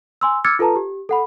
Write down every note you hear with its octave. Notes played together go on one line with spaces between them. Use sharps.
G#5 C6 E6
D6 E6 F6 G#6 A6 C#7
F4 A4 B4 A5 A#5
G4
A4 F#5 B5